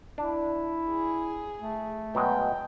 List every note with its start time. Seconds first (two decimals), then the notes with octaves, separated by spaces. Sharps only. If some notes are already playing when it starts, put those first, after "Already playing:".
0.18 D4 E4
0.89 G#4
1.60 A3
2.15 B2 F#3 G#3 G5